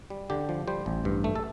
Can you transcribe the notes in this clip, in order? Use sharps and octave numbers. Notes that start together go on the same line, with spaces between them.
G3
D3 G4
F3
G3 C5
A1
G2
A3
A4